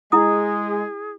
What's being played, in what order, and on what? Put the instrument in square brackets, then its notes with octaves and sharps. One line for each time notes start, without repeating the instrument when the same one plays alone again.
[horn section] G#3 [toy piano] E4 D#6 [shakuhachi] G#4